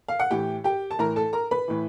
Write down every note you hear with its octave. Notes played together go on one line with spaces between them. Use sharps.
F5
F#5
A2 E3 G4 G5
G4 G5
A5
A2 E3 A#4 A#5
A4 A5
A#4 A#5
B4 B5
A2 E3